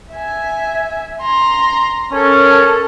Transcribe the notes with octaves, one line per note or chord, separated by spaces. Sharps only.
E5 G#5
A#5 C6
C#4 A4 A#4